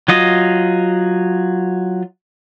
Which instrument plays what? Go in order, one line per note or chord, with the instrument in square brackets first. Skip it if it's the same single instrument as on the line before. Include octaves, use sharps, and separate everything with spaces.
[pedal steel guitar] F#3 F4 D#5